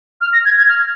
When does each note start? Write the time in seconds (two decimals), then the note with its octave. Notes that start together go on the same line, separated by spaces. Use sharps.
0.21 F6
0.33 A#6
0.45 G#6
0.58 G#6
0.69 F6